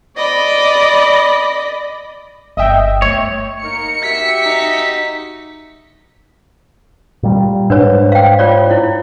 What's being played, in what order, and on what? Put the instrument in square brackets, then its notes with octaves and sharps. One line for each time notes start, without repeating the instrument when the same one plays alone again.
[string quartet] D5 D#5 B5
[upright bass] G1 [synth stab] D#5 E5 G5
[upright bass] A3 [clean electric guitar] C#5
[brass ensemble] A#3 D#4 A#4 [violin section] C#7
[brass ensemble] F#4 G4 E5 [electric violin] B6
[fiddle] D#4
[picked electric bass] A#2 G3
[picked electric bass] G#2 [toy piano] D4 B4 C#5
[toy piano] F5 G5
F4 C#5 D5
E4